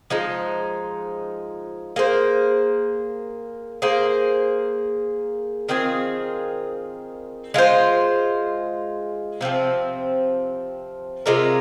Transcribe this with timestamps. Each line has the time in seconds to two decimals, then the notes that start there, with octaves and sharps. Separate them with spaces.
0.10 F3 G#3 D#4
1.96 A#3 G#4 C5
3.82 A#3 G#4 C5
5.69 D#3 C4 F4 G#4
7.54 G#3 F4 C5
9.41 C3 F3 C4
11.26 C3 G#3 F4 A#4